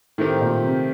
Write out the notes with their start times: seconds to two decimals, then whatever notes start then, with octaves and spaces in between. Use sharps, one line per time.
0.18 A2 D#3 A3 C4 G4 A#4
0.41 A#2
0.64 C3